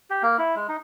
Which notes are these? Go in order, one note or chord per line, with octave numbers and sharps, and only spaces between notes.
G4
A#3
E4
G#3
D#4